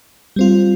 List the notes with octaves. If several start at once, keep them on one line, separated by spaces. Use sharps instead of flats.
G3 C4 F4